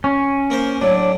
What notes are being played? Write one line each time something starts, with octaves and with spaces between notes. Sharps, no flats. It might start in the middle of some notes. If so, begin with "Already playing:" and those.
C#4
A#3 A#4 C5
A2 F#3 D4